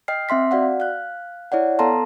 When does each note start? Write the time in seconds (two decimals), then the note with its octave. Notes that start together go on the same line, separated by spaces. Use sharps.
0.08 D#5 G5 F6 C7
0.29 C4 E5 C6 B6
0.51 F#4 D5 F5 F#5
0.80 F5 F#6
1.52 E4 C#5 D5 F#5
1.79 B3 A4 F5 A5 A#5 C6